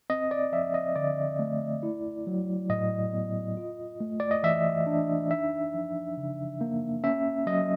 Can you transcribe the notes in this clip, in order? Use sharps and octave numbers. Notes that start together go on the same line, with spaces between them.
C4 D#5
D5
F3 E5
D#5
D3 D5
A3
E4
F#3
A2 D#5
B3
F4
A3
D5
D#5
E3 E5
D4
D#4 E5
F3
C#3
A#3
C#4 E5
F#3 D#5